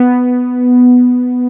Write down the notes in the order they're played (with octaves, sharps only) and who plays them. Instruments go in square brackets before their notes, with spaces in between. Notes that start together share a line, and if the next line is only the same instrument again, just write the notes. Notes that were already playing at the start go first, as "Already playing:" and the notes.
Already playing: [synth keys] B3